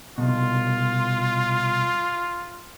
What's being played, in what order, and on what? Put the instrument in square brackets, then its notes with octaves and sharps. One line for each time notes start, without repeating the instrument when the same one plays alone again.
[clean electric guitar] C2 B2 [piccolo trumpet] F4